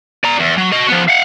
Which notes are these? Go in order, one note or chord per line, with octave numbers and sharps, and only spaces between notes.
D5 A#5
E2
F#3
F#4 D#5
F3 B3
F5 F#5